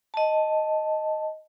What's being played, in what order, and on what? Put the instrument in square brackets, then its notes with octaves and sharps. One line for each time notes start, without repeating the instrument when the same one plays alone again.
[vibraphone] D#5 A5